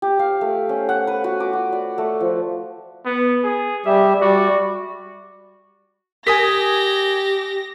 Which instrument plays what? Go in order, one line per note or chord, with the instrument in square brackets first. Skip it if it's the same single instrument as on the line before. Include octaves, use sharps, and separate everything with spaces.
[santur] G4
F5
A3
C#4
F#5
B4
F#4
D6
F#4
D5
A3
F3
[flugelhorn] B3
G#4
[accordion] G3 G4 [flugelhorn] E5
[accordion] G3 D5 [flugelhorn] F#4
[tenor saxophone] G4 [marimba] A#4 [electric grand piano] G#5 D#6 B6 [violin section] A#6